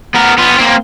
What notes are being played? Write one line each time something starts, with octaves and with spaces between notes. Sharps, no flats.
B3 A#4
B3 F4
A#3 C4